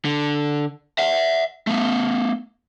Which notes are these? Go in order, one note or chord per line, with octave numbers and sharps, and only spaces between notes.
D3
E5 F#5
A3 B3